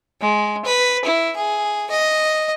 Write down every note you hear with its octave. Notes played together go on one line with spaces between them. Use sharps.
G#3
B4
E4
G#4
D#5